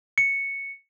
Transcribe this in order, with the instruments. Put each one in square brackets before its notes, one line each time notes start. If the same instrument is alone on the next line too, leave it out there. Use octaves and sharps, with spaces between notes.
[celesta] C#7